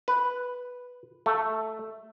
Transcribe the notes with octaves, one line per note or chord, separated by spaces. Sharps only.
B4
A3